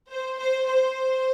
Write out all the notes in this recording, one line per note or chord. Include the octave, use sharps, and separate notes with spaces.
C5
C5
C5